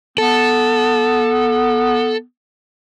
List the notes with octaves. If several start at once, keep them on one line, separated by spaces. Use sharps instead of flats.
B3 A4